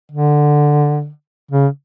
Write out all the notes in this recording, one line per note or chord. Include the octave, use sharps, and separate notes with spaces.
D3
C#3